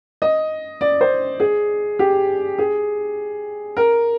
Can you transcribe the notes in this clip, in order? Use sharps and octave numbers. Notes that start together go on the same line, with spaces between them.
D#5
D5
C5
G#4
G4
G#4
A#4